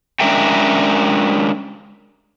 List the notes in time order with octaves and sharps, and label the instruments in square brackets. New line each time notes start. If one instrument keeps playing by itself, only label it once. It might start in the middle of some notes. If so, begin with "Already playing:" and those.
[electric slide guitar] G#3 C#4 D4 A#4 E5 G5